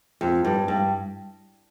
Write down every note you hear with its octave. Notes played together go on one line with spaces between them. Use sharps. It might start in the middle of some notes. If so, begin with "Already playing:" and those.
F2
G2
G2